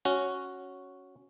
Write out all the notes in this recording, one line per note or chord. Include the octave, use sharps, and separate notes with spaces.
C#4 F#4